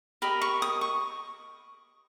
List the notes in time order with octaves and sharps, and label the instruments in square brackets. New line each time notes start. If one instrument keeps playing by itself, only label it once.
[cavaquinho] G4 A#4 D#5 B5
C#6
D#6
C#6